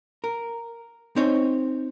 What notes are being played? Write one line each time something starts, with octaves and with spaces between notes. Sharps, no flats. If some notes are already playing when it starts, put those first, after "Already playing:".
A#4
C4 D#4 C5 C#5